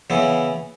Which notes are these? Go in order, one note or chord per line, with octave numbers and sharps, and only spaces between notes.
C#3 E3 B3 E4